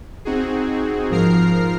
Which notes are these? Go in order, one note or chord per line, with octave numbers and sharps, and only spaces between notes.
C4 D#4 F#4 G#4
G#2 F3 A#4 A#5 F6 C7